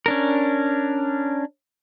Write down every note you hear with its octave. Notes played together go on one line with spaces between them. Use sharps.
C#4 D4 A#4